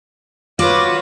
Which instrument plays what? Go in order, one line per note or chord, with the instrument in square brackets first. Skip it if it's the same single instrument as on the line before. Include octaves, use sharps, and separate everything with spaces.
[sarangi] F4 [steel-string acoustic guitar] F#4 [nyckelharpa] B4 C#5 [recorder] D6